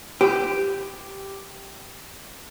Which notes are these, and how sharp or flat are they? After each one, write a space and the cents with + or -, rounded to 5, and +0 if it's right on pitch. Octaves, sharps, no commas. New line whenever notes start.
G4 +0 B4 +45